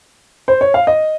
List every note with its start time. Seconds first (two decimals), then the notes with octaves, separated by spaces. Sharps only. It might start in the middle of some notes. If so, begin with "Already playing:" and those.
0.48 C5
0.61 C#5
0.74 F5
0.87 D#5